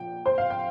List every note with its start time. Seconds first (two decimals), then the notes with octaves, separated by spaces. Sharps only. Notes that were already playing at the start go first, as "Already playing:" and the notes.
Already playing: A#2 F3 G5
0.26 C5
0.38 F5
0.50 G5